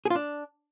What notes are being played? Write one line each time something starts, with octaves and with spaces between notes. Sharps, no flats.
G#4
F4
D4